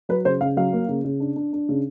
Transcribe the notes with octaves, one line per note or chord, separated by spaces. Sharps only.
F#3 B4
C#3 C5
C#3 F5
F#3 F5
A#3
C#3
C#3
D4
D4
D4
C#3